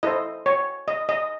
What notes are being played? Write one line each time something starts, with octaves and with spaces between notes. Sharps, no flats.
E4 A4 C5 D#5
C#5
D#5
D#5